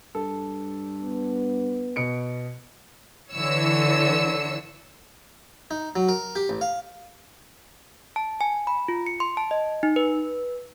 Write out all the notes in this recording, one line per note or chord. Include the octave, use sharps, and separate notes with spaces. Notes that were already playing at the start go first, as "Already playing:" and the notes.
G2 A4
B3
B2 C#7 D7
D3 E3 C#5 E6 C#7
D#4
F#3
A#4
G4
A1
F5
A5
G#5
B5
F4
C#7
C6
A5
D#5
D#4
B4